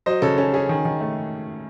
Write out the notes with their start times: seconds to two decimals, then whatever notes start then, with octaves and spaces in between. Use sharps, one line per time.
0.06 F#3 C5 D#5
0.22 C#3 A4 C#5
0.38 C#4 A4
0.54 C#4 G#4
0.69 D#3
0.85 D#3
1.01 A3